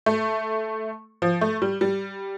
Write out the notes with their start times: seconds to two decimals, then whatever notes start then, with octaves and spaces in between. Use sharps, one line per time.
0.06 A3
1.22 F3
1.41 A3
1.62 G3
1.81 G3